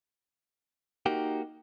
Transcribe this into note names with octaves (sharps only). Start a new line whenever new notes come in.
A#3 D#4 F#4 G4